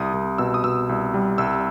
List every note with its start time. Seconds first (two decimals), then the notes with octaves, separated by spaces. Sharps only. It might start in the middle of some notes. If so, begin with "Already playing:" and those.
Already playing: C2 D#6
0.14 C2
0.38 B2 E6
0.54 D#6
0.64 B2 E6
0.89 C2
1.14 G3
1.38 C2 E6